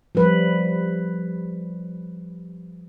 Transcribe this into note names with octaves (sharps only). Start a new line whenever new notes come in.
F3 G3 B4